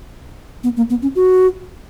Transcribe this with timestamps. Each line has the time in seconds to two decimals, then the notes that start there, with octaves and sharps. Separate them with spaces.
0.64 B3
0.77 A#3
0.90 B3
1.02 C#4
1.15 F#4